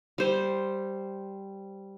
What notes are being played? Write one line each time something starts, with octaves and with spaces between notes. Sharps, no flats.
G3 C5